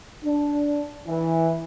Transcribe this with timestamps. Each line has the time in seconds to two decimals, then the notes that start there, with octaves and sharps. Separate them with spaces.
0.25 D4
1.07 E3